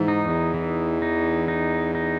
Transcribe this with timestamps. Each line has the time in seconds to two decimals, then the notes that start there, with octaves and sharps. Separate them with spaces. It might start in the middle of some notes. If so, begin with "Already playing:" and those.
Already playing: G#2 E3
0.08 D#4
0.24 E2
0.54 E3
1.02 D#4
1.48 D#4
1.95 D#4